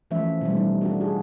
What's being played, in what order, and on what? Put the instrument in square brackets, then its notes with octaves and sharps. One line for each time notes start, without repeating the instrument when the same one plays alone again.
[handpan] E3 F3 A3 C#4 E5
B2 G3 A3
G3 D#4
D4 F4 F#4 A4
F#4 G#4